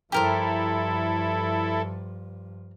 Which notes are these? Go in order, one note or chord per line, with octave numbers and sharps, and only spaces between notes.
G2 F3 E4 G4 A4 A#4 C5